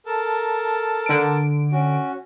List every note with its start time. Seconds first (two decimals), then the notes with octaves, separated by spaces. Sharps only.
0.06 A4 A#4 A5
1.06 D3 D7
1.72 C#4 F#4